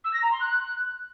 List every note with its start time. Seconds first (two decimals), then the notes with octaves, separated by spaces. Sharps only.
0.04 E6
0.13 A#6
0.22 A#5
0.31 C6
0.40 F#6